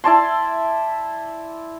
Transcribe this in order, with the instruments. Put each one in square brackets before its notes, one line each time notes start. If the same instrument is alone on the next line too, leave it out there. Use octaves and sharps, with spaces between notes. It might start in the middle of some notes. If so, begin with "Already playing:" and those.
[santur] E4 D5 A5 C6